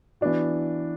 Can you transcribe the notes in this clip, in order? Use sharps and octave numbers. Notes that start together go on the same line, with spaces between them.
E3 B3 D4 F#4